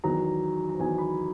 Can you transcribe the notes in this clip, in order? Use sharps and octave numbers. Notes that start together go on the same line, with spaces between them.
E2 D#3 F#3 A#5
A#5
E2 D#3 F#3 G#5
B5